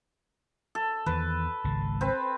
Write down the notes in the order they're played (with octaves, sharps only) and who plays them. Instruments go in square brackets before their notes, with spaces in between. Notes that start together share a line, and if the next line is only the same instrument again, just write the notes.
[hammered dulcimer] A4
[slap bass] E2 D#3 [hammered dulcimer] B4
[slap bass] G#1 C#2 C#3
[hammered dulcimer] C4 B4